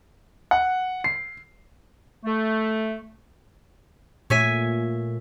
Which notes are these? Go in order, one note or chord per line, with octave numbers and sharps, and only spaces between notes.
F#5
C7
A3
A#2 A3 C#5 E5 G#5